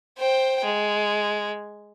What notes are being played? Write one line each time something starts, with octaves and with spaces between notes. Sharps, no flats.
C5 G5
G#3